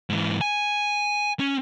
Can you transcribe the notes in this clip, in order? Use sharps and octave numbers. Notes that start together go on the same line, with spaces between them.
G#2 E3
G#5
C#4